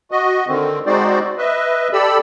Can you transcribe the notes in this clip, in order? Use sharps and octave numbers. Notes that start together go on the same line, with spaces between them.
F#4 D#5
D3 D#3 C4
G#3 C4 D#4 F#4 C5 D5
B4 D#5 E5
G4 A4 D5 B5 E6